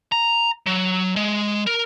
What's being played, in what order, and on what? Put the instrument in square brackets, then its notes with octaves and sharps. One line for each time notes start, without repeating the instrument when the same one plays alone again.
[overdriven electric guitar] A#5
F#3
G#3
A#4